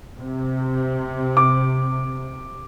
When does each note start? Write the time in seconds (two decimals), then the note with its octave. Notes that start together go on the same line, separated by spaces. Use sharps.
0.18 C3
1.37 D6